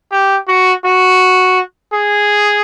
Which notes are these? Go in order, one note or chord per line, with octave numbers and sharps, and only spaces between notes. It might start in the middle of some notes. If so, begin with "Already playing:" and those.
G4
F#4
F#4
G#4